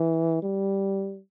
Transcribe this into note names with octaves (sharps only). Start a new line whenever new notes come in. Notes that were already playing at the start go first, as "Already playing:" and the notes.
Already playing: E3
G3